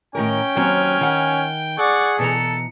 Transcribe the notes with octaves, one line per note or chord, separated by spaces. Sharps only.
A2 D#3 C#4 A#4 G5
D#2 F#3 C4 G#5 F6
D#3 F#5
G#4 D5 F#5 C#6
B2 E3 A4 A#5 C#7